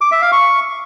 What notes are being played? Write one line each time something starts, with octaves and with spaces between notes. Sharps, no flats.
D6
E5
F5
C#6